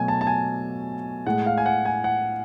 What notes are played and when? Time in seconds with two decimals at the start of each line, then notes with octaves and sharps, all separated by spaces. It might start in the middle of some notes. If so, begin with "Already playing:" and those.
Already playing: B2 F#3 A3 G#5
0.08 A5
0.21 A5
0.27 G#5
1.26 A2 G#3 F#5
1.46 F5
1.58 G#5
1.66 F#5
1.85 G#5
2.04 F#5